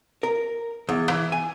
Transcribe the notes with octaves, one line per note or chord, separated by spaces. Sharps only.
A#4
E2
E3
G#5